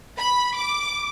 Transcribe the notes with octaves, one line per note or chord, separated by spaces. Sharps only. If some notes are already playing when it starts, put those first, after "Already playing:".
B5
D6